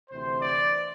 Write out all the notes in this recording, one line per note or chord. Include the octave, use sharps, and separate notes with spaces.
D2 C3 E3 C5
D5